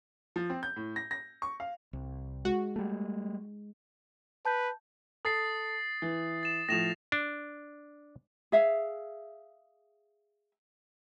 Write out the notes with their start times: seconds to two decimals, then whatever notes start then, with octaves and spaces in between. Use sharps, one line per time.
0.36 F3
0.50 C4
0.63 G6
0.76 A2
0.96 A#6
1.11 A#6
1.42 C#6
1.60 F5
1.93 C2
2.45 G#3 F#4
2.76 G3 A3
4.45 B4 A5 G6
5.25 A4 D#6 A6 C7
6.02 E3
6.43 A6 E7
6.69 A2 F3 A#6 E7 F7
7.12 D4
8.52 G#4 E5 F5